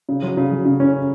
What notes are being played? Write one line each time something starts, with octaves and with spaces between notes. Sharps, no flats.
C#3
F#3
C#3
F#3
C#3
C#4